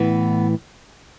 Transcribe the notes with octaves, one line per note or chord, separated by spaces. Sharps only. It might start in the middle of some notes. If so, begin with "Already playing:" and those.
Already playing: A2 E3 B3